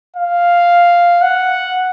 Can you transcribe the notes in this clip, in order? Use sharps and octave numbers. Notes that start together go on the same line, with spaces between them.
F5
F#5